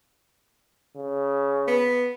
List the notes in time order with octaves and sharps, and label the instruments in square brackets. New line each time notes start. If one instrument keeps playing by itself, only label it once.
[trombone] C#3
[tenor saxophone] B3